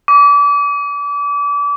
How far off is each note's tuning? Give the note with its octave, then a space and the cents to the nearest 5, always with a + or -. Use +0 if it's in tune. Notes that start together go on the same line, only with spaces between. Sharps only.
D6 -35